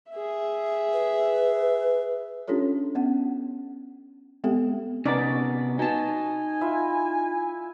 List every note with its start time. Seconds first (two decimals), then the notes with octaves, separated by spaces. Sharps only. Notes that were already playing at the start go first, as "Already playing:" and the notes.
0.11 G#4 E5
0.93 B4
2.48 C#4 D4 F4 G4 A4 C#5
2.95 B3 C#4 F#5
4.44 G#3 B3 C4 G4 A4
5.06 C3 B3 C#4 D#4 D5
5.79 D#4 F#4 G#5 A5
6.61 E4 F4 E5